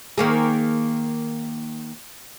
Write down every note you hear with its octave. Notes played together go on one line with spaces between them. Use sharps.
D#3 A#3 G#4